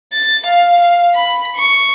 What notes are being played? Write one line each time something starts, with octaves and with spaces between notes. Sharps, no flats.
A6
F5
F5
B5
C#6